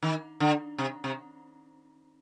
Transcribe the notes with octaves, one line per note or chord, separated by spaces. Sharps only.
D#3
D3
C3
C3